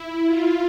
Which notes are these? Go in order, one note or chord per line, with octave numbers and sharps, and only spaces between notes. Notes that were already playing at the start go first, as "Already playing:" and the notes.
Already playing: E4
F4